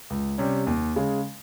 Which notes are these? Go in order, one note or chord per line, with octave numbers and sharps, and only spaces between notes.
C#2
C3 G3 C#4
D#2
C#3 G#3